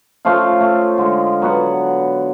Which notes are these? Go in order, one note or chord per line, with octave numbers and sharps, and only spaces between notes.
F3 A3 C#4 F5
A3
D3 G#3
F#3 B3 B4 F#5